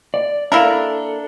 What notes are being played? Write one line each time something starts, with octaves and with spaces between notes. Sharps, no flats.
D5
A#3 D4 E4 A4 A#4